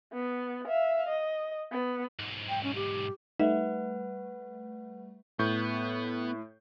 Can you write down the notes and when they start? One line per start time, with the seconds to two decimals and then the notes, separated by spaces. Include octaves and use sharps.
0.13 B3
0.68 E5 F5
1.09 D#5
1.72 B3
2.20 B1 G#2
2.49 G5
2.63 C#4
2.75 G4
3.40 G3 A3 D#4 B4 E5 F#5
5.39 A2 B3 C#6 G6